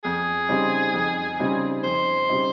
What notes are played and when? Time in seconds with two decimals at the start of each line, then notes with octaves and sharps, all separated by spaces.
0.04 F2 G#4
0.49 C#3 G3 C4 D#4
0.94 F2
1.40 C#3 G3 C4 D#4
1.83 F2 C5
2.29 C#3 G3 C4 D#4